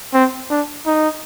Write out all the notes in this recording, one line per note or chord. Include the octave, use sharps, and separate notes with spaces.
C4
D4
D#4